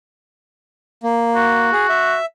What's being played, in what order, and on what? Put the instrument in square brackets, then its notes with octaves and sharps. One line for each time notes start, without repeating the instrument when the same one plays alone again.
[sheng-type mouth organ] A#3
[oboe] F#4
[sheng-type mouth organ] G#4
E5